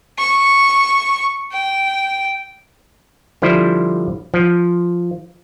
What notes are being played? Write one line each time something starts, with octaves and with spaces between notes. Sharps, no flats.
C#6
G5
D3 F3 G3 E4 C5
F3